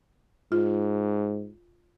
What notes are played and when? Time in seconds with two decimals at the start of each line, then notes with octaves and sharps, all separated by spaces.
0.52 G#2 F4